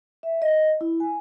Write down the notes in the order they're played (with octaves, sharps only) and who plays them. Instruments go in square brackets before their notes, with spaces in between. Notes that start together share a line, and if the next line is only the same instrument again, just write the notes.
[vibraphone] E5
D#5
E4
G#5